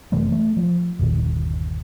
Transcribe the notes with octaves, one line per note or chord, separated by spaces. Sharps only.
F#1 C3 E3 A3
A3
F3
G1 D#2 A#2 D#3